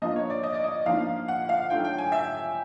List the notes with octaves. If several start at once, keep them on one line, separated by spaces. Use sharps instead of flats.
F3 A#3 D4 F4 D#5
C#5
D5
D#5
D5
D#5
F3 A#3 D4 F4 F5
F#5
F5
F#3 A3 D4 F4 G5
G5
G#5
E5